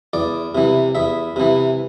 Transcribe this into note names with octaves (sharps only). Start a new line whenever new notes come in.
E2 D5
C3 E3
E2 E5
C3 E3